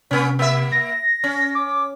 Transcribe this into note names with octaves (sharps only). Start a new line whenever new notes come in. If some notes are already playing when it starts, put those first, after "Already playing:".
C3 A#3 C#4
A#3 E5
A#6
C#4
D6